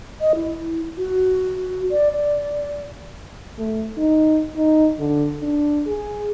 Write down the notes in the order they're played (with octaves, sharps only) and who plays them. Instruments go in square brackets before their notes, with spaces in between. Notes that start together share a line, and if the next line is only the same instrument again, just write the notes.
[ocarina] D#5
E4
F#4
D5
D5
[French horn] A3
D#4
D#4
D3
D4
G#4